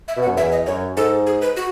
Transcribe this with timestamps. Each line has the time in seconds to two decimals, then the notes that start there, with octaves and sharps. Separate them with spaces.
0.08 E5
0.17 B2
0.22 F#5
0.27 F#2
0.37 E2 E5
0.52 D#5
0.67 F#2 C#5
0.97 G#2 A4
1.27 G#4
1.41 B4
1.56 F#4